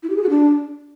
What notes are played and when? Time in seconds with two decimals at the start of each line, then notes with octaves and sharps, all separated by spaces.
0.03 E4
0.10 G4
0.16 G#4
0.23 F#4
0.30 D4